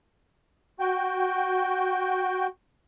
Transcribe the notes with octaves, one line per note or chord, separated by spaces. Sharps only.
F#4 G5